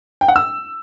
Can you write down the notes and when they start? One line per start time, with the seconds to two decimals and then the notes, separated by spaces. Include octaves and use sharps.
0.21 G5
0.28 F#5
0.36 E6